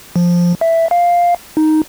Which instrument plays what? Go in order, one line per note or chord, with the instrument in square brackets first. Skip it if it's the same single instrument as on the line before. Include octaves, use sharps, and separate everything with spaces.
[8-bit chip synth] F3
E5
F5
D#4